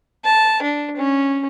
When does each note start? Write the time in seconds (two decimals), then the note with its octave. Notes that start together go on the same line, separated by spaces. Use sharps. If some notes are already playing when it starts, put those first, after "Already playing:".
0.25 A5
0.62 D4
0.97 C#4